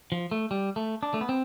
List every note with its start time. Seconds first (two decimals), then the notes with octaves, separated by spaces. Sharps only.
0.12 F3
0.31 A3
0.51 G3
0.76 A3
1.03 D4
1.14 A3
1.21 B3
1.29 C4